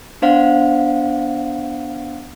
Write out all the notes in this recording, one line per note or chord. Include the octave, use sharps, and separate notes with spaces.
B3 D4 C5 F5 F#5